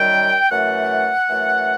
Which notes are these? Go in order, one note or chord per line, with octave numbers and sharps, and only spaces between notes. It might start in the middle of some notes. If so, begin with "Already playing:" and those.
Already playing: F#2 D#3 G3 G5
F#2 E3 A3 F#5
F#2 E3 A3